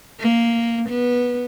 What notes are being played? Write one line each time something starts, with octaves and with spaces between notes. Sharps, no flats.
A#3
B3